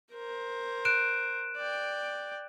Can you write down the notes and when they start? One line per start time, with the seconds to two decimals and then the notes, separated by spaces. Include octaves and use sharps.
0.13 A#4 C5
0.85 F#6 D7 E7
1.57 D5 G5